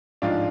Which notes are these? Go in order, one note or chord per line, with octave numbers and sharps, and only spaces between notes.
A1 G#2 F3 D4 F4